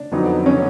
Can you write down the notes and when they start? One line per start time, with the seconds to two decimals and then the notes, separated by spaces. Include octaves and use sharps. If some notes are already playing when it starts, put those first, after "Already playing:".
Already playing: D4
0.11 F2 D3 F#3 B3 D#4
0.46 C#4